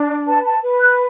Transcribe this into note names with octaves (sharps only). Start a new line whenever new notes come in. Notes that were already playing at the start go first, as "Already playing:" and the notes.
Already playing: D4
B4 A5
A5
B4
F#6